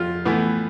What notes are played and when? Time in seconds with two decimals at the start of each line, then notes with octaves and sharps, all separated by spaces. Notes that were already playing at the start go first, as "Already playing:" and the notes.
Already playing: F2 F4
0.25 A2 E3 B3